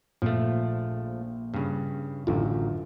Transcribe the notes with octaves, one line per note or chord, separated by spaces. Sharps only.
A#1 F3 A3
G2 C#3
A1 F#2 D3 F4